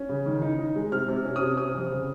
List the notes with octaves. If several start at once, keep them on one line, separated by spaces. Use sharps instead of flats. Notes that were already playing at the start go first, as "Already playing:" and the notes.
Already playing: C#4
C#3
D#3
D#4
D#4
G#3
C3 F6
C3
C#4
D#6
C3
C4 D#6
F2
C#3